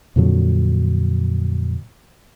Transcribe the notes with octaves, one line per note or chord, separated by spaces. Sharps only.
F2 A#2 D3 F#3